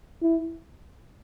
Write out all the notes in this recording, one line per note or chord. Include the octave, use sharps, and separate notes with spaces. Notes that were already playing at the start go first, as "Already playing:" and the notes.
E4